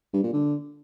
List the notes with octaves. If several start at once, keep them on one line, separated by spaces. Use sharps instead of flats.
G2
A#2
D3